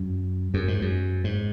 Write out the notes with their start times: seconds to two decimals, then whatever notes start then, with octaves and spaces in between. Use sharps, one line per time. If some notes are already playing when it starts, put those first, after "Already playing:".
Already playing: F#2
0.54 F#2
0.68 G#2
0.82 F#2
1.24 G#2